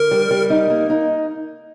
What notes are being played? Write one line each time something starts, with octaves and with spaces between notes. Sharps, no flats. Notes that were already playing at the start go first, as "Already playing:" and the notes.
Already playing: D3 A#4
G3
G3
D#4
A#3
D#4